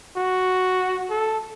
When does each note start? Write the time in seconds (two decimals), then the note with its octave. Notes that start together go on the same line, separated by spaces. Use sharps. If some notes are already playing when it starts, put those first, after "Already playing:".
0.17 F#4
1.10 A4